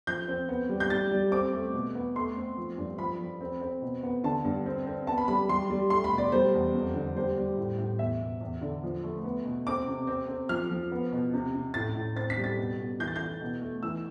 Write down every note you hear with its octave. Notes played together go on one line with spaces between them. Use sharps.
F3 G6
C4
B3
G3
G6
G3 A6
G3
C4 D6
A3
B2
B3
A3 C6
C4
F3
G2
F3 B5
F3
C4
C4
B2
B3
D3 A5
G2
C4
C4
B3 A5
B5
G3 B5
G3 C6
G3
A3 C6
B5
B2
D5
G3 C5
E2
F2
D3
G3 C5
G3
A2
A2
E2 E5
B2
E2
D3
F3
A3
B3
B2
C4 D6
C3
C4
C4
F3 F6
F3
B3
B2
C3
C3
A2 A6
A2
C4 A6
B6
G3
A6
B2
B2
E3 G6
A6
E3 G6
B2
A3
E3 E6